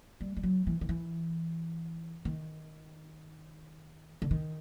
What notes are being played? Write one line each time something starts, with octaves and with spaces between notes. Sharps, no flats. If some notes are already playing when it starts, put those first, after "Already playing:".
G3
G3
F#3
E3
D#3
E3
D#3
D3
D#3